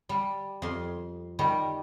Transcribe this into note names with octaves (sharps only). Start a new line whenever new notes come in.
G3
F2 C6
D#3 G3